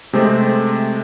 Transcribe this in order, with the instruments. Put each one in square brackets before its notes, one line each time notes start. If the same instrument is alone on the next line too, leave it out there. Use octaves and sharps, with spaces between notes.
[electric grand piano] C3 G#3 A3 C4